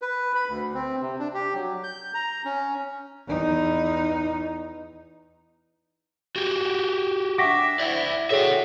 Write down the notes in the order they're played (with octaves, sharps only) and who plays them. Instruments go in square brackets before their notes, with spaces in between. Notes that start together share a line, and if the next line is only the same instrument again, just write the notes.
[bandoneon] B4
B5
D2
C4
C3
D4
G4
F#3
G6
A#5
C#4
[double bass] E2 D#4
[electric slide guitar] F#4 G4
[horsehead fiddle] D4 E5 [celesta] F#5 G5 C#6 [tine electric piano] D6 A#6 B6
[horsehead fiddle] E4 [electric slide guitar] D5 E5
[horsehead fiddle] F#4 [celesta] G#4 A4 C#5 [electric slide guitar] E5 G5